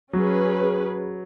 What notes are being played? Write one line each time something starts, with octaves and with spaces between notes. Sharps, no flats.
F#3 C#4 G#4 B4